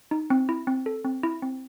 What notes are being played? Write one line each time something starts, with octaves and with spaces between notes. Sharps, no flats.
D#4
C4
E4
C4
A4
C4
E4
C4